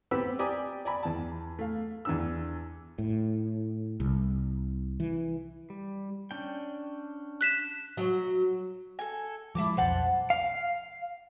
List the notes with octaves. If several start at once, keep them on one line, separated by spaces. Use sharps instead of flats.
B3 C4 G4 B4 E6
G4 D5 G#5 A#5 D#6
D5 G#5 A#5 B5
E2 A5
A3 F5
E2 D4 E6
A2
C2
E3
G3
C#4 D4 G5
F#6 B6 E7
F#3
A4 G#5
F3 G#3 E4 A5 D6
B1 F2 C5 F#5 A5
F5